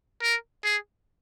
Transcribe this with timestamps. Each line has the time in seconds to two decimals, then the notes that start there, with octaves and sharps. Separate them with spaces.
0.23 A#4
0.64 G#4